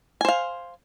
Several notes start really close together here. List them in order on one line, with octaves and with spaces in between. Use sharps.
G#5 C5 F5